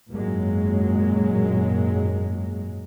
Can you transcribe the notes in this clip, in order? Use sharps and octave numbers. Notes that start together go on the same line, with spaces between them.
G#1 F#2 A#2 F#3 G#3